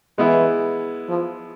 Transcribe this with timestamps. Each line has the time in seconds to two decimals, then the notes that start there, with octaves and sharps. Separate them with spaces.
0.18 E3 G#3 B3 E4
1.09 F3